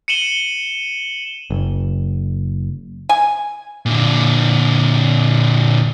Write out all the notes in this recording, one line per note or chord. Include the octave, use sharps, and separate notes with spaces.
C#7 D#7 E7 F#7 G7
F#1
G#5
A#2 D3